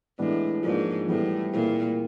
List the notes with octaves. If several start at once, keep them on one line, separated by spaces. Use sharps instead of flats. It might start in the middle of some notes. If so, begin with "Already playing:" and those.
A2 E3 G#3 B3 D4
G#2 F3 A#3 D4 F4
A2 E3 G3 B3 E4 A4
A#2 E3 A3 C4 E4 G#4